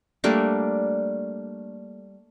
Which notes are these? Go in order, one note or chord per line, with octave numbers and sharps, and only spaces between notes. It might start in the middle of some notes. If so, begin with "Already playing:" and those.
G3 A3 A#3 D4